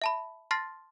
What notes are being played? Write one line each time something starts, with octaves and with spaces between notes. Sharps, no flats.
E5 A5 B5
A5 C6 F6 A6 A#6 C7